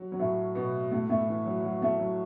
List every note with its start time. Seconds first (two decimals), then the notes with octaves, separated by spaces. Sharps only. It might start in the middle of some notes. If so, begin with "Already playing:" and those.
Already playing: F#3
0.12 F#3
0.19 A2 A3
0.55 B2 B3
0.91 A2 A3
1.09 A2 A3
1.28 E3
1.46 F#3
1.64 F#3
1.82 A2 A3
2.00 F#3